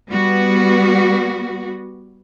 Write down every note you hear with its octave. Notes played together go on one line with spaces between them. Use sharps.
G3 B3 F#4